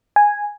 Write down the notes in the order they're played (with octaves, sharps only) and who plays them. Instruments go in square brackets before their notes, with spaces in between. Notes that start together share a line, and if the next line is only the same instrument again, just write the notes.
[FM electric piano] G#5